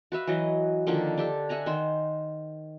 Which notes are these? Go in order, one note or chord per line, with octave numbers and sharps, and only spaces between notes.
F#4 B4 E5 F5
E3 F#3 C#5 D#5
D3 D#3 F3 A#3
D4 G4 A4
E5 F#5 G#5 A#5
D#3 C5